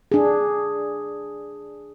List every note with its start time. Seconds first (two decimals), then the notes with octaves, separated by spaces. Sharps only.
0.12 D4 G#4